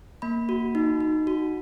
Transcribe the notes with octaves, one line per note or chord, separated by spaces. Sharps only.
A#3 B5
F#4
D#4
D#4
F#4